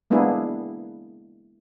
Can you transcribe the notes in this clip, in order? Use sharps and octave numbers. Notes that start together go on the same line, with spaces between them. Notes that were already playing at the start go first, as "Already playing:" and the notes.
G#3 A#3 B3 D4 E4 G#4